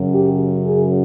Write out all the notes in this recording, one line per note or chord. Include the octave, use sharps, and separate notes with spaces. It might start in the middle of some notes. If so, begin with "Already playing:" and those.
Already playing: F#2 C#3 F#3
G4
G#4